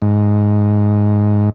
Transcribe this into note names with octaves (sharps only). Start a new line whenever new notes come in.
G#2